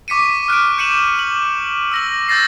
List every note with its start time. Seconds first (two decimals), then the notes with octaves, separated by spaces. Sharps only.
0.08 C#6 D6 B6 C#7 D#7
0.48 F6 F#6 B6 D7
0.78 F#6 G6 C#7 D#7 E7 F#7
1.19 F#7
1.92 E6 A#6 F#7
2.28 E6 G6 A6 A#6 C7